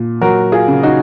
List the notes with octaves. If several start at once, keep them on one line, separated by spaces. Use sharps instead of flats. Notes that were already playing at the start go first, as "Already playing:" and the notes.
Already playing: A#2
F#3 F#4 A#4
F4 G#4
C#3
D#4 F#4